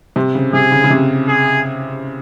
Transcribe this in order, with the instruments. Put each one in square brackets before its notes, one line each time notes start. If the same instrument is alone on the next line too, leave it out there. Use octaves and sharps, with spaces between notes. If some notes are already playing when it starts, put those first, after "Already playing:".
[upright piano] C3
C#3
[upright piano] C3 [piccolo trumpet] G#4
[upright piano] C#3
C#3
C3
[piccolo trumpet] G#4